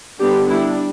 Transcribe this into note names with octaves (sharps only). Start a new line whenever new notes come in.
D3 G3 B3 D4 G4
G3 D4 E4